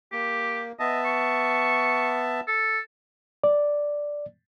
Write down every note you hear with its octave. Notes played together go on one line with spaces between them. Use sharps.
A#3 G4
B3 D#5 E5 A5
C#6
A4
D5